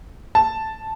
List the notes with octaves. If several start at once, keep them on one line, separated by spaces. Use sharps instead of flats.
A5